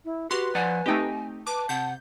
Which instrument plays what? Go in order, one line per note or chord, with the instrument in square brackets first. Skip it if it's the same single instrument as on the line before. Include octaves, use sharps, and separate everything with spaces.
[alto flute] E4
[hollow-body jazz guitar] F#4 [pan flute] G4 [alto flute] B4 [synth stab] C6
[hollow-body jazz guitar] F3 D5 F#5 [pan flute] G#5
[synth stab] A3 D#4 G4 [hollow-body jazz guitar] C4 D#5 G5
[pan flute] B4 [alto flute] A5 [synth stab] D6
[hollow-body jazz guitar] C3 [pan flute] F#5 [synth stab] G6